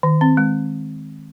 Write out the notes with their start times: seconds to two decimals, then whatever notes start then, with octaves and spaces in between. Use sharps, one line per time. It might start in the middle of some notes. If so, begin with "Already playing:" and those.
0.03 D#3
0.21 C4
0.37 G#3